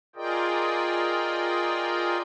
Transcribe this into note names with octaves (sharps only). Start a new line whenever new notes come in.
F4 G#4 A#4 D5 D#5 G5